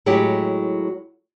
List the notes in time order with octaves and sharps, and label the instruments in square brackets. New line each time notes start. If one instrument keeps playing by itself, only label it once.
[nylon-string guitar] A2 F#3 G#3 E4 G4